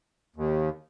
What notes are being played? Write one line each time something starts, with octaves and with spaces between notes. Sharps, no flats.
D#2